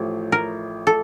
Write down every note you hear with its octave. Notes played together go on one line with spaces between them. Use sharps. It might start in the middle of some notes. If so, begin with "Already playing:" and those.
Already playing: A1 A2 F3 A3
A#4
A4